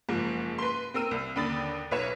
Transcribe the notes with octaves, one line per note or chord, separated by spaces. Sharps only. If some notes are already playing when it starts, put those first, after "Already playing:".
F#1 G#2 F3
B4 C6
C4 A#4 E6 D#7
C2
D#2 D3 B5 D#6 A6
B1 B4 C#5 E7